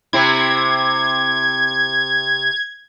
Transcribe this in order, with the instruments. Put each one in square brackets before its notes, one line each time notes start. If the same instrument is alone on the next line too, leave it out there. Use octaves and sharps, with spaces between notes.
[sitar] C3 C4 E4 [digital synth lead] G#6